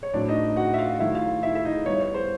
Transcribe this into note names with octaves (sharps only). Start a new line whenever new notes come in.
C#5
A2 F#3 A3 C4 D4 D5
D#4 D#5
F#4 F#5
E5
F4 F5
D#3 F#3 A3 E4 E5
F4 F5
E4 E5
E5
D#4 D#5
E3 G3 B3 C#5
C#5
C5